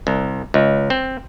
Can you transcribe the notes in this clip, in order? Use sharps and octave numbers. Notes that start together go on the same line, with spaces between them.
C2
C#2
C4